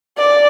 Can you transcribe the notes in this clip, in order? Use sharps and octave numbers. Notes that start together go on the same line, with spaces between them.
D5